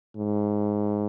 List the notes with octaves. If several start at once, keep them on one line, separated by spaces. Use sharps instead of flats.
G#2